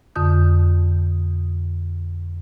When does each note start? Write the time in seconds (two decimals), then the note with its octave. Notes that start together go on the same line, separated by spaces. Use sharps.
0.16 F2 D3 D#6 G6